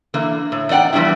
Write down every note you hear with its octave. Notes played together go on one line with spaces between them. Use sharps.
D3 E3 A#3
A2
E2 D#4 D5 F#5 G5
E3 F3 G3 B3 D4 E4